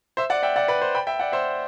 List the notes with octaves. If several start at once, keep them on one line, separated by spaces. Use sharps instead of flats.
C5 E5
D5 F#5
E5 G5
D5 F#5
B4 D5
C5
G5 B5
E5 G5
D5 F#5
C5 E5